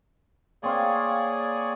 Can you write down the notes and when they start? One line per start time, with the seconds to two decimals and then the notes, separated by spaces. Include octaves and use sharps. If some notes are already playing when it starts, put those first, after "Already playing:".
0.63 A#3 C4 G#4 C#5 D5 F5